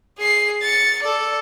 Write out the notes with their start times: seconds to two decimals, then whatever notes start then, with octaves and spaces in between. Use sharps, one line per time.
0.19 G#4 C7
0.62 A6 C#7
1.03 A4 D5